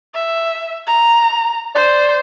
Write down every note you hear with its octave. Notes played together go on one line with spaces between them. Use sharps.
E5
A#5
C5 D5